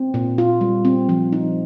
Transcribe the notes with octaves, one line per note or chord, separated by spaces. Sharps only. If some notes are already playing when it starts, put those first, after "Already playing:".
Already playing: C4
A#2
F4
G3
C4
F3
D#4